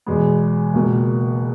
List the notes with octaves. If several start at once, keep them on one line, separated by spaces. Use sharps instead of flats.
E2 B2 G#3 B3
C#2 B2 A#3